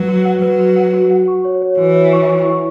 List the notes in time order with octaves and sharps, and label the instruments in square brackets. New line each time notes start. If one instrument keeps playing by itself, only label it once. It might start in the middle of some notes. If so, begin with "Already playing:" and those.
Already playing: [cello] F#3 [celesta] B4 F#5
[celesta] F#4
F#5
[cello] F#3 [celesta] B4
[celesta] F#4
F#5
F#4
F#5
C#6
C#5
C#5
[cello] E3 [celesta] F#4
[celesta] C#5
C#6
C#6
E4